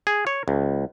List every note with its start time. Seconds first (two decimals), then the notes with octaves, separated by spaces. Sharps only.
0.07 G#4
0.27 C#5
0.48 C#2